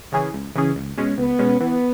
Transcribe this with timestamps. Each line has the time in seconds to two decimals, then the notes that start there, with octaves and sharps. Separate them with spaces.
0.12 C#3 E3 C#4 G#4
0.33 C#2
0.55 C#3 E3 C#4 G#4
0.75 C#2
0.97 B2 G#3 C#4
1.18 C#2 B3
1.39 B2 G#3 C#4
1.60 E3 B3